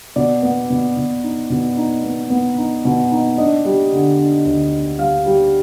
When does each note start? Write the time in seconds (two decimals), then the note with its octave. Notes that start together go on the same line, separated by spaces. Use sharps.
0.16 B2 D5
0.43 B3
0.70 B2
0.97 B2
1.23 D#4
1.50 B2
1.77 D#4
2.04 B3
2.30 B3
2.58 D#4
2.85 B2
3.11 D#4
3.38 D4 D#5
3.65 G3
3.92 D3
4.19 D4
4.45 D2
4.72 D4
4.99 G3 F5
5.26 G3